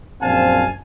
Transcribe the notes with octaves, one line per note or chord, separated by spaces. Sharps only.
A#1 F#2 C4 F5 G#5 A5